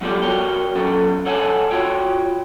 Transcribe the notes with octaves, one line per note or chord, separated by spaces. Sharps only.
F#3 B3 F4 G4 A4 D5
F#4 A#4 C#5 G5
F#3 B3 C#4 A4
A4 C#5 F#5 G#5 A5
F4 F#4 C#5 G5